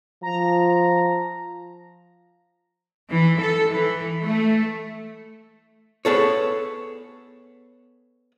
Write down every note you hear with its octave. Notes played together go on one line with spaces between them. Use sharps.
F3 A#5
E3
A4
E3
A3
B3 G#4 A4 C#5